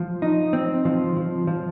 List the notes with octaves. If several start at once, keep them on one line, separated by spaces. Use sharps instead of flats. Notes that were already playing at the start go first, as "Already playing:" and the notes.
Already playing: F3
D#4
C4
F3
F3
F3